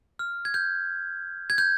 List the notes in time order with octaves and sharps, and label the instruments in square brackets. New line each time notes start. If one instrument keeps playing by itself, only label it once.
[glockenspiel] F6
G#6
G6
G#6
G6